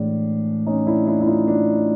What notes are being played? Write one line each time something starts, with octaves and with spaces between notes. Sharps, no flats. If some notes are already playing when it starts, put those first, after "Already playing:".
Already playing: A2 E3 G#3 D4
C#4 D#4
D4 E4
D4 E4
E4
D#4 F4
D4